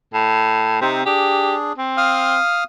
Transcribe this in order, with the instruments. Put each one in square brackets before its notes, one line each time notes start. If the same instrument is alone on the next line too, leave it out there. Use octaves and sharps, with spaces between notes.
[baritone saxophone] A2
[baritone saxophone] C3 [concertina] C4 D#4 C5
[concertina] D4 G#4 [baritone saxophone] G4
[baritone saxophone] C4
[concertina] F5 D#6 F6